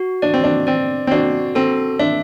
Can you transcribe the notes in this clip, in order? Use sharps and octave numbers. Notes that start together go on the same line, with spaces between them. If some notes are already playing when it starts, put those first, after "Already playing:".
Already playing: F#4
D4 D5
C4
D4
C4 D5
C4
D4 F#4
C4 A4
D4 E5